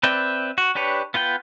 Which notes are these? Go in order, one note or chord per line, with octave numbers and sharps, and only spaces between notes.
C4 B4 D5 E5 G5
F#4
D4 G4 B4 C#5
B3 F4 B4 G5